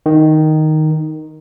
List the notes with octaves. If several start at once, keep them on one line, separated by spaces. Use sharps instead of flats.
D#3